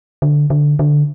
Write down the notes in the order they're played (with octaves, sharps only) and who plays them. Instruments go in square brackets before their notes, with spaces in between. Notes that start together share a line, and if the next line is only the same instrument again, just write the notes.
[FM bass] D3
D3
D3